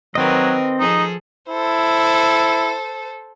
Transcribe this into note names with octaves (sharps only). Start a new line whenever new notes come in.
D#3 F#3 C4 A#4 B4 D#5
F3 D#4 G#4 A4
E4 A4 C5